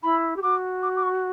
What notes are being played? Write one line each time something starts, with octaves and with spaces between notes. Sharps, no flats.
E4 B5
G4
F#4 D6
D6
D6
C#6